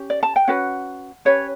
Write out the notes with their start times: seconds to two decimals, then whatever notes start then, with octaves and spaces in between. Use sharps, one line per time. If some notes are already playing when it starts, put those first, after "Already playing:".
Already playing: C#4 G4
0.10 D5
0.23 A5
0.36 G5
0.48 C#4 F#4 B4 F#5
1.25 C#4 G4 B4 C#5